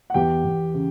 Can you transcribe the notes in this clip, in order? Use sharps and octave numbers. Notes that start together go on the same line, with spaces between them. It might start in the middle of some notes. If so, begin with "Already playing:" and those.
F#5
E2 G4 G5
E2
C#3